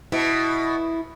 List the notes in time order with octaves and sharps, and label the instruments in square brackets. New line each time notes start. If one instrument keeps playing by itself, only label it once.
[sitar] B2 [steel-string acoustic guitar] E4